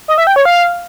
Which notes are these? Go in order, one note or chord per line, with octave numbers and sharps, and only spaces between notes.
D#5
E5
G5
C#5
F5